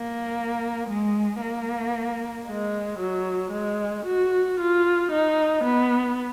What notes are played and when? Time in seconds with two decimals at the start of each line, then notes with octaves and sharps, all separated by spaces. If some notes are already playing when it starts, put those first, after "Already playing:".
Already playing: A#3
0.89 G#3
1.42 A#3
2.47 G#3
3.00 F#3
3.53 G#3
4.06 F#4
4.59 F4
5.11 D#4
5.64 B3